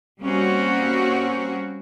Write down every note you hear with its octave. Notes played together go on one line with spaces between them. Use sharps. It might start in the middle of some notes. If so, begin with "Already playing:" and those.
G3 A#3 C4 C#4 F#4